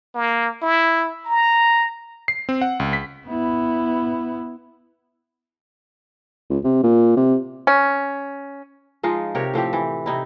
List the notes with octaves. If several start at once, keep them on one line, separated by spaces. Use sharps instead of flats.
A#3
E4
A#5
C7
C4
F#5
C#2
B6
B3 E4
C#2
C3
A#2
C3
C#4
F3 G#3 D#4 F4
C3 G4 A#4 C#5
A2 F3 C4 G4
E3
C3 D#4 E4